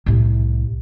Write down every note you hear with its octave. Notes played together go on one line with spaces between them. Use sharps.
C2 A2